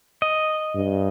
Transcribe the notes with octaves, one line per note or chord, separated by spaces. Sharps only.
D#5
G2